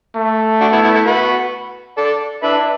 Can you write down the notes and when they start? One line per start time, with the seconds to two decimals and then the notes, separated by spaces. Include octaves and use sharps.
0.15 A3
0.61 D4 F#4
0.72 B3 E4
0.84 B3 E4
0.95 E4 A4
1.06 F#4 B4
1.98 A4 D5
2.43 D4 B4 E5